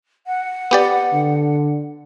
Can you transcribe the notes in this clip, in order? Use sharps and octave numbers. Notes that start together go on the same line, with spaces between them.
F#5
B3 G4 D5
D3